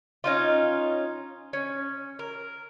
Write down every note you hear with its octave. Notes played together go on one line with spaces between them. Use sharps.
C#4 D#4 F4
C#4
A#4